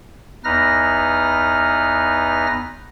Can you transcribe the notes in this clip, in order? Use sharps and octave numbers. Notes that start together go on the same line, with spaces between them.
E2 D#4 B4 F6 A#6